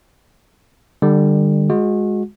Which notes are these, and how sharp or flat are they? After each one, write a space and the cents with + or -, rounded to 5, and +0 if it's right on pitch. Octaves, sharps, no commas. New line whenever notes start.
D3 +35 G3 +20
G#3 +0 F#4 -30